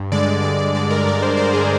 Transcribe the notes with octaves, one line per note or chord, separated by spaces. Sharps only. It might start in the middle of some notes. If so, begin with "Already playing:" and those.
Already playing: G2
D3 G#3 D5
G2 D5
D5
D3 G#3 D5
A#4
G2 D5
C5
D3 G#3 C5
G#4